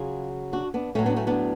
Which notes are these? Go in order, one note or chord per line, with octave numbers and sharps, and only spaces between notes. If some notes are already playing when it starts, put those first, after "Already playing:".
Already playing: C#3 F#3 F4 G#4
D4 F#4
B3 D4
A2 F#3 A3 C#4
B3 D4
A3 C#4
B3 D4